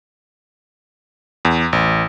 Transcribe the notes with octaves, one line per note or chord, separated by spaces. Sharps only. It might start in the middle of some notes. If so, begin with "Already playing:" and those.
E2
A1